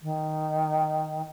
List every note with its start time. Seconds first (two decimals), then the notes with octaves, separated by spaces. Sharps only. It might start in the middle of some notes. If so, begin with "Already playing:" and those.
0.02 D#3